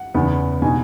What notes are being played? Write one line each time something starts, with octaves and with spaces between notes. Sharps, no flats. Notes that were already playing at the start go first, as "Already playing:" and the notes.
Already playing: F#5
E2 C#3 E3 B3 D#4
B2 G#3 D#4 G#5